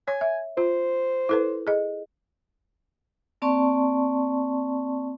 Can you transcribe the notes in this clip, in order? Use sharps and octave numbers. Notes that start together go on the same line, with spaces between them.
C#5 G#5
E5
F4 C5
E4 A4 B4
G#4 D#5
A#3 C4 D5 A5 C6 C#6